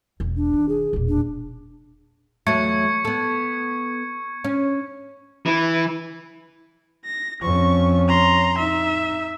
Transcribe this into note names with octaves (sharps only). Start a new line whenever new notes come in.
E1
D4
D#3
G#4
E1 A#2
D4
E2 F#3 A3 C#6 G#6 C#7
B3 A4
C#4
E3
A#6
F2 C#4 C#6
A#5 C6
D#4 E5